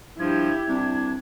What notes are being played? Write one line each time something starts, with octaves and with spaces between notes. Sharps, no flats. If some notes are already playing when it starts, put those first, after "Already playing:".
G2 F3 E4 G4 G#6
C2 D4